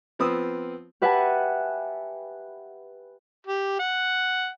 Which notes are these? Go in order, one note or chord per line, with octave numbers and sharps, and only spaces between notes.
F3 B3 C4 D#6 E6
G4 B4 E5 F#5 G#5 A5
G4
F#5